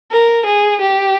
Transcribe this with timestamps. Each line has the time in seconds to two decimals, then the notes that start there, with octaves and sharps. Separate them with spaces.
0.12 A#4
0.46 G#4
0.81 G4